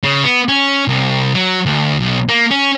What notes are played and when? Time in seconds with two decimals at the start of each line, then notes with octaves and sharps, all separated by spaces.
0.04 C#3
0.23 B3
0.48 C#4
0.88 C2
1.34 F#3
1.66 D2
1.99 B1
2.29 A#3
2.51 C#4